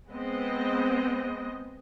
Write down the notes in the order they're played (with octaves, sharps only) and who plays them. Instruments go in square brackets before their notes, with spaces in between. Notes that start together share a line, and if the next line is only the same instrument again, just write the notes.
[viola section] G#3 B3 C4 D#5